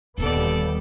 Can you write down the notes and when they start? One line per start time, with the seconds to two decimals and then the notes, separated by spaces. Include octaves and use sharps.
0.18 D#1 D#2 D3 G3 B3 A4 D5